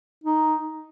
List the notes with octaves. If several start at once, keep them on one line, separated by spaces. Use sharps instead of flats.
D#4